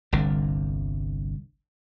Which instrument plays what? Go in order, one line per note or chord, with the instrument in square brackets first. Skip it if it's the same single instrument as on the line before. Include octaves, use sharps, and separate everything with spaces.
[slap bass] G1 C2 D3